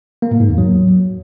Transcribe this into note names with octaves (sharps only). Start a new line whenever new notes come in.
A#3
A2
G#2
E2
F#3